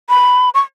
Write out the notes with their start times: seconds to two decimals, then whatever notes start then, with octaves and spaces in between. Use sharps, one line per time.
0.09 B5
0.54 C#6